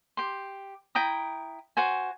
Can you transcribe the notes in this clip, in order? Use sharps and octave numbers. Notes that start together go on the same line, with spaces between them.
G4 C6
E4 G5 A#5 D#6
F#4 C5 G#5